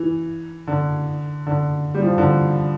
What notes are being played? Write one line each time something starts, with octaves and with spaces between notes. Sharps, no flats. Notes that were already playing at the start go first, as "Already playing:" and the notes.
Already playing: E3
D3
D3
G3
F3
E3
D3